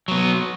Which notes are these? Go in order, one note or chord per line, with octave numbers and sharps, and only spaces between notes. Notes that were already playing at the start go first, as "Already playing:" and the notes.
F#3 B3